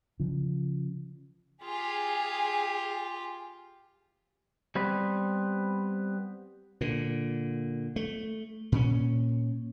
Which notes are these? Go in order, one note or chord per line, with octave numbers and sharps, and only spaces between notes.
C#3 F3
F4 G4 G#4
G3 B3 C4 B4
A#2 D3
A3
A#2 C#4